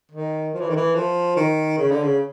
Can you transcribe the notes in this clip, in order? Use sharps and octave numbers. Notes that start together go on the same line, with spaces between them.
D#3
F3
E3
D#3
E3
F3
D#3
C#3
D3
C#3